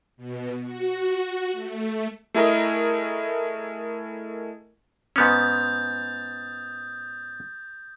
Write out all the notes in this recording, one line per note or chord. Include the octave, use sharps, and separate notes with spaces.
B2
F#4
A3
A3 E4 G#4 A#4 D#5
G#2 B3 C#4 D#6 G6 A6